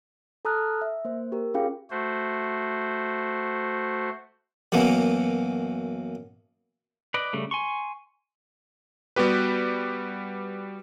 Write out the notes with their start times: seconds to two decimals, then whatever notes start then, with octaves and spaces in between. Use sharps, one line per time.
0.45 A4 A5 A#5 D#6 F6 F#6
0.81 E5
1.05 A#3 C5
1.32 G4 A#4
1.54 C#4 F4 G#4 F5 G5
1.90 A3 F#4 C5
4.72 F#2 B2 E3 A#3 B3
7.14 B4 D5 D#5
7.33 C#3 G3 A3
7.51 G#5 C6 C#6
9.16 G3 B3 F#4 G4 B4